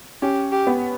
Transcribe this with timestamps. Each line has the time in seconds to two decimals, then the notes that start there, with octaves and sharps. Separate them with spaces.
0.22 C#4 G4
0.52 G4
0.67 B3